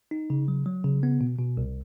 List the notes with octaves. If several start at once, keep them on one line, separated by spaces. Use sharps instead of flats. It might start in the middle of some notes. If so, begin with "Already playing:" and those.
D#4
C#3
F#3
F#3
C#3
B3
B2
B2
C2